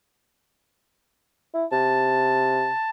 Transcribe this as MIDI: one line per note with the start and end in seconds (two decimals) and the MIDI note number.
1.54 1.65 64
1.72 2.70 48
1.72 2.90 81